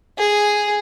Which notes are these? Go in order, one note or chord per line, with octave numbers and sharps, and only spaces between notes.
G#4